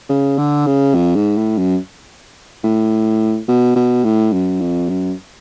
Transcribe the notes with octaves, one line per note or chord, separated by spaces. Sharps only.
C#3
D3
C#3
F2
G#2
A2
F#2
A2
B2
B2
A2
F#2
F2
F#2